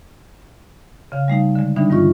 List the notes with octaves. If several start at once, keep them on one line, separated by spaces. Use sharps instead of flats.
C#3 F5
G3 A3 D#4 F5
D3 G#3
D3 E3 G3 B3 D4 D#4
G2 D#3 F4 C#6